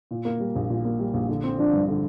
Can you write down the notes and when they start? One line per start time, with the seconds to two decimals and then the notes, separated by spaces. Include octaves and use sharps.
0.11 A#2
0.25 A#3
0.40 G3
0.56 A#1
0.70 A#2
0.85 A#3
0.99 G3
1.14 A#1
1.29 D3
1.44 C4
1.58 F3 D4
1.73 G2
1.89 D3